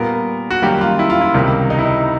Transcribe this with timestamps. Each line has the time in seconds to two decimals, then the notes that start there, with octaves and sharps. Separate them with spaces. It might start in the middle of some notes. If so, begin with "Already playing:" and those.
Already playing: A#2 G3 B3 A#4
0.50 F#4
0.62 F#2 D#3 G3 A#3 G4
0.81 F4
0.99 E4
1.10 F4
1.21 E4
1.34 C#2 C3 D#3 G3
1.70 D#4
1.79 E4
1.85 D#4